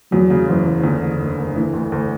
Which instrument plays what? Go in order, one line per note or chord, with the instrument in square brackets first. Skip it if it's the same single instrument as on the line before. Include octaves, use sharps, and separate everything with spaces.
[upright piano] E2 [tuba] F#3
[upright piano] C#3
[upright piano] F#1 [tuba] E3
[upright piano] F#1
[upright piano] E2 [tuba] D3
[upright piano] F#1
F#1
F#1
[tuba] D3 [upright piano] E3
[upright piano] D2
D2